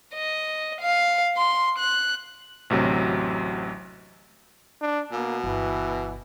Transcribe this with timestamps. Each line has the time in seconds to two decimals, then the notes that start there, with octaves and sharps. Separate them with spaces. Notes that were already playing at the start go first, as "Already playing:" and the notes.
0.14 D#5
0.81 F5
1.37 C6
1.78 F#6
2.70 A1 D2 C3 F#3
4.82 D4
5.12 B2 A#3
5.44 G1 E3